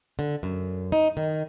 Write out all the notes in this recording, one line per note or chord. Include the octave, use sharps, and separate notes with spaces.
D3
F#2
D#4
D#3